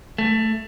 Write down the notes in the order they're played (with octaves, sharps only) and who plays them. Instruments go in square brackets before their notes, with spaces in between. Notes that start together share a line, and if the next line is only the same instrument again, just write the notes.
[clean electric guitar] A3